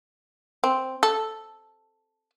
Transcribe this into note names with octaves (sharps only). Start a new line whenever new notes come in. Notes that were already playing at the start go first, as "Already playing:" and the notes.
C4
A4